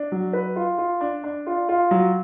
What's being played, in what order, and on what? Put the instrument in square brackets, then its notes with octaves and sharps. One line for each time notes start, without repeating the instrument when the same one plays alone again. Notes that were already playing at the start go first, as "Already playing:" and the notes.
Already playing: [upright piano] D4
F#3
B4
F4
F4
D4
D4
F4
F4
F#3